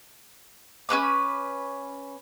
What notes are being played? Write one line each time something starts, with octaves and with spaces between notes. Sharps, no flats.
C#4 G4 B4 D6